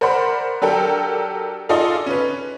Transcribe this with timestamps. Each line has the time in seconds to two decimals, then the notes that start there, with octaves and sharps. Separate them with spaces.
0.01 A#4 C5 D5 F#5 B5
0.62 F#3 D4 G4 A4 A#4
1.69 D#4 F4 G#4 A4 D5 D#5
2.06 C#4 B4